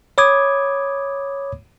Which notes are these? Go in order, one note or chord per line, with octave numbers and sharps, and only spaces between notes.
C#5 B5 D6 D#6 G#6